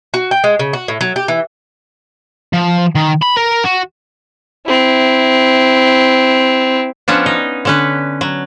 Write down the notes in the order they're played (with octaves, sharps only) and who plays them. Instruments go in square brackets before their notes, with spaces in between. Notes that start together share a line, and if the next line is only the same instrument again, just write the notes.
[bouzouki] F#4
G5
G#3
C#3
F#4
A2
F#3
G4
E3
[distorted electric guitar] F3
D#3
B5
A#4
F#4
[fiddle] C4 E4
[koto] F3 B3 C#4 D4
D#4
D3 C#4 B4
F#3